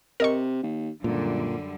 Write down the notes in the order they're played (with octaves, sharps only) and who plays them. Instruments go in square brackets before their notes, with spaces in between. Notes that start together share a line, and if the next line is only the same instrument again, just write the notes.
[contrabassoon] C3 [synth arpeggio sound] A#4 D#5 C#6
[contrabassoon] D#2
[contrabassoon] C#2 [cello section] F#2 D3 G3 [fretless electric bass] A#2